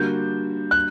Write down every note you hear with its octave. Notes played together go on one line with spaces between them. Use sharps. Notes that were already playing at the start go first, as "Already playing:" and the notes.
Already playing: D3 G3 A#3 D4 F#4 G6
F#6